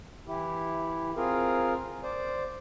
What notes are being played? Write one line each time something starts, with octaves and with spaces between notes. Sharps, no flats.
E3 E4 G4
C4 F4 G#4 A#4
C5 D5